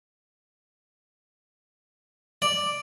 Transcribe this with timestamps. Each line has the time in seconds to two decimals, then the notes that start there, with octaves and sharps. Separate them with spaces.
2.42 D5